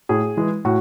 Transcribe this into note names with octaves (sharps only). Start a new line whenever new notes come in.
A2 G#4
E3 G#3
A2 F#4